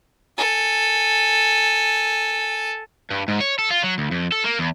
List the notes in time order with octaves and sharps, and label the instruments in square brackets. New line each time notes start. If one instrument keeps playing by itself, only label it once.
[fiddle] A4 G#5
[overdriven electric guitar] G2
G#2
C#5
A4
F4
F#3
D2
F2
A4
A#3
E2